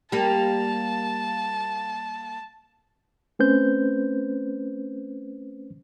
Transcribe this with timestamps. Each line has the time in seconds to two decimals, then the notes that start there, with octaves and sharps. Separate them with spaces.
0.12 G3 A#3 A5
3.39 A3 C4 C#4 B4 C5 G6